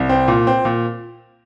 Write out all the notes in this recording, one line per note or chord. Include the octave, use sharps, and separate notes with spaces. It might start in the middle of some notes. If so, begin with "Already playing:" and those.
Already playing: C2
C4
A#2
C4
A#2